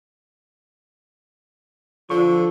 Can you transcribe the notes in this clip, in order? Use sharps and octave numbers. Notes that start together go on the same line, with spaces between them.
D3 F3 F4 C#6